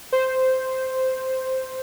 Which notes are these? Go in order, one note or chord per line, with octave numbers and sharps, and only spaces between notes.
C5